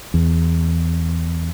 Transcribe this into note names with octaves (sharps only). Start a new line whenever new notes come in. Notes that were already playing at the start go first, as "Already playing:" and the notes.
E2